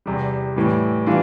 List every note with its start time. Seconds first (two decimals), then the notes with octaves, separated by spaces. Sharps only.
0.06 E2 C3 G3
0.56 A2 E3 G3
1.06 E3 G3 D4 F4